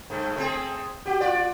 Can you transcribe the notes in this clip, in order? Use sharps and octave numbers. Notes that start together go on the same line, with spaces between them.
G2 A3
A3 C4 G#4
F#4 G4
F4 D5